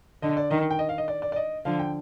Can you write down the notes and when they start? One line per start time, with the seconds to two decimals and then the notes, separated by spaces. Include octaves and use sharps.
0.22 D3 D#5
0.37 D5
0.51 D#3 D#5
0.71 G5
0.79 D#5
0.89 F5
0.98 D#5
1.08 D5
1.22 D5
1.32 D5
1.36 D#5
1.65 D3 F3 F5
1.79 G5